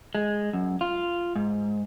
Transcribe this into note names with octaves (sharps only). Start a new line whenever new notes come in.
G#3
F#2
F4
G#2